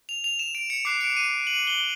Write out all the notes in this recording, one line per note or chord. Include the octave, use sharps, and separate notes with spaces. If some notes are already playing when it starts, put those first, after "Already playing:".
F7
F7
E7
D7
C#7
D6 F#6 C7
D7
D#7
F#7
G7